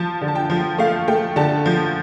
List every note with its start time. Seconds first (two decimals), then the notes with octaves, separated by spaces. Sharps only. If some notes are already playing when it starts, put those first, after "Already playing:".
Already playing: F3 A5
0.21 D3
0.28 A5
0.35 G5
0.50 F3
0.78 A3 F5
1.08 A3 G5
1.36 D3 A5
1.66 F3